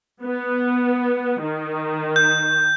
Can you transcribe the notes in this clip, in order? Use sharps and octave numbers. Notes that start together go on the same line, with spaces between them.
B3
D#3
G6